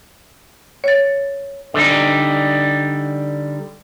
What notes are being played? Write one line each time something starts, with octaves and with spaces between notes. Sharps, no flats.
C#5 A6
D3 G3 D#4